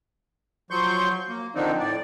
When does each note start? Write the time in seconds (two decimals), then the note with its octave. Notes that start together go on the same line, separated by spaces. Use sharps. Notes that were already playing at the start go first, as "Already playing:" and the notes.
0.71 F3 F#3 C6 C#6 G6
1.29 A#3
1.55 D3 D#3 F3 C4 D4 D#4
1.80 A2 D5